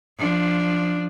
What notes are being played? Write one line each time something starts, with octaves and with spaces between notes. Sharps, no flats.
F3 D4